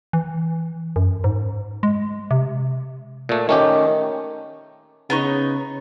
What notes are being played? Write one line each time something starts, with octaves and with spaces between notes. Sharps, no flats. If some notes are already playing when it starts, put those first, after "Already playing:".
E3
F#2
G#2
G#3
C3
A#2 A3
D#3 A3 C#4 G4
C#3 B3 D#4 C#6